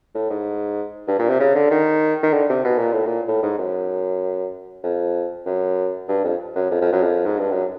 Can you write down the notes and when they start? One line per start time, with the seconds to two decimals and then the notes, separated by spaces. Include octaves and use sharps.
0.14 A2
0.30 G#2
1.08 G2
1.19 A#2
1.29 C3
1.40 C#3
1.55 D3
1.71 D#3
2.23 D#3
2.33 D3
2.49 C3
2.65 B2
2.78 A#2
2.92 A2
3.06 A#2
3.28 A2
3.43 G#2
3.58 F#2
4.83 F2
5.46 F#2
6.08 G2
6.24 F2
6.55 F#2
6.71 F2
6.81 F2
6.92 F#2
7.03 F2
7.26 G#2
7.38 G2
7.51 F#2